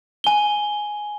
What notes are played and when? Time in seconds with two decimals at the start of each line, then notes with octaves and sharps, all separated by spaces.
0.24 G#5 G7